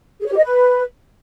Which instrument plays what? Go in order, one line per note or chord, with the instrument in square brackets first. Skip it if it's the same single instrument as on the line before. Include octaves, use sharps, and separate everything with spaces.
[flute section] G#4
C#5
G4
D#5
B4